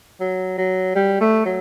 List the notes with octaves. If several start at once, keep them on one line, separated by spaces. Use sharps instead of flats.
F#3
F#3
G3
A3
F#3